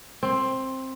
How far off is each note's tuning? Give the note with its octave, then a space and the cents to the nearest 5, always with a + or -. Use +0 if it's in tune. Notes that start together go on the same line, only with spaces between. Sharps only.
C4 +10